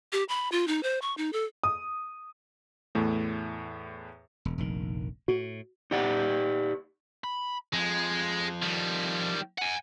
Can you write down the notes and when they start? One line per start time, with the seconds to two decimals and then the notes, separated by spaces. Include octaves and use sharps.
0.13 G4
0.29 B5
0.52 F4
0.68 D#4
0.83 C5
1.02 C#6
1.17 D#4
1.33 A4
1.64 D#6
2.95 E2 A2 A3
4.45 E1
4.58 F1 A#1 D#3
5.28 A2 F#4
5.91 D#4 G4 D5 F#5
7.24 B5
7.74 F2 F3 G#3
8.63 D#3 G3
9.58 F#5 G#5